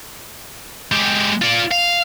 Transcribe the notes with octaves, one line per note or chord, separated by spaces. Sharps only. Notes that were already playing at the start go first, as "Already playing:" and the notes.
G#3 G4
F4 D5
F5